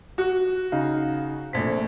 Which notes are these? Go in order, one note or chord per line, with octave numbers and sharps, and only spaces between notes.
F#4
C#3 D#4 F5
A#1 A3 C4 G#6 B6